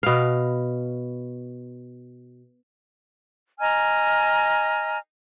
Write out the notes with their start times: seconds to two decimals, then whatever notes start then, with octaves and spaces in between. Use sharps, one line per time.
0.03 B2 F5
3.60 D#5 G#5 A#5 F6